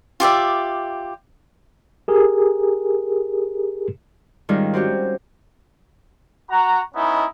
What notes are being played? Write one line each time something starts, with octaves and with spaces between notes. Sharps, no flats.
F4 G4 D5 E5
G4 G#4 A#4
G#2 D#3 G3 G#3 C#4 F4
C4 C#4 F#4 G4
F#4 A#5
G#3 B3 C#4 D#4 E4